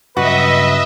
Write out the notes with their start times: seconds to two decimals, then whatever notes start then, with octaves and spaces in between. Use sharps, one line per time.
0.17 G2 C#3 F#3 F#4 B4 D#5 E5